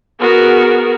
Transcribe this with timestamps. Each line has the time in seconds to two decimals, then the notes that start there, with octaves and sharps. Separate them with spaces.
0.19 B3 F#4 G#4 A#4